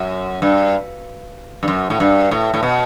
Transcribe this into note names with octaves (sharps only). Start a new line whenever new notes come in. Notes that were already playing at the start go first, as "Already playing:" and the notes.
Already playing: F#2
G2
G2
F#2
A2
G2
A2
A2
B2